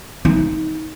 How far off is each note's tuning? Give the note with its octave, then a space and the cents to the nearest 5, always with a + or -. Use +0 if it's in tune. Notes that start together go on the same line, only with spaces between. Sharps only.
D#4 +20